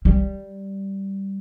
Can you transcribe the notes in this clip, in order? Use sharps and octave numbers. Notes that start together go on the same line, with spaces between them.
G3